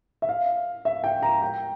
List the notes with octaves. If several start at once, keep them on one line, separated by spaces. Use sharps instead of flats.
E5
F5
E5
G5
A#5
G5